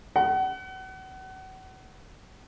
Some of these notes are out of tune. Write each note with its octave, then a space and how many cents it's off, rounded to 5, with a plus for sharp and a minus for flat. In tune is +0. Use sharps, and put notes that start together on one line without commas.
F#5 +30